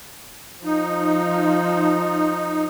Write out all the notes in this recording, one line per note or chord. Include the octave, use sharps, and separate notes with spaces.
F3 D#4